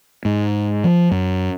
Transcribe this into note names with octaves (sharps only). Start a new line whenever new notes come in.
G#2
F3
F#2